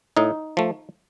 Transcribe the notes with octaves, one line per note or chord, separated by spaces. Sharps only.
A2 D#4
F3 A3